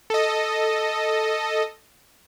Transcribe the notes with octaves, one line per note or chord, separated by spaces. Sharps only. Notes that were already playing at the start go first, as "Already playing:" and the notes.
A4 D#5